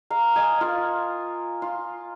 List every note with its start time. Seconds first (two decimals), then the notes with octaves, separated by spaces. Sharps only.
0.10 F5 A#5
0.36 D#5 G#5
0.61 F4 A#4
1.62 F4